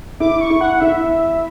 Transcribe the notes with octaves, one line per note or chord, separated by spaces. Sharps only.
E4 D6
C#6
E4
F#5
E4 E5